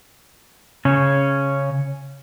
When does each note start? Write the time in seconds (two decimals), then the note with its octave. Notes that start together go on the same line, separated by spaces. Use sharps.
0.85 C#3 C#4